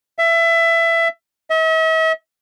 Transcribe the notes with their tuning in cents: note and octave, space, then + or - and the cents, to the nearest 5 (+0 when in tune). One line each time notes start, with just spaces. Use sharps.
E5 +20
E5 -45